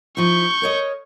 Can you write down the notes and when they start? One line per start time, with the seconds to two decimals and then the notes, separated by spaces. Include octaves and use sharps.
0.17 F3 D#4 E4 C#6 G6
0.62 A#4 C#5 D#5